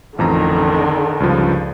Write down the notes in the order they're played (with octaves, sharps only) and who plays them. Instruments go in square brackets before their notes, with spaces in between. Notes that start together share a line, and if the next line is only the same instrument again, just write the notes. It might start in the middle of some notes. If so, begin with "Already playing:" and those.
[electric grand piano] A1 F2 A#5 [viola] D3 D#3
[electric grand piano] C#2 G2 F3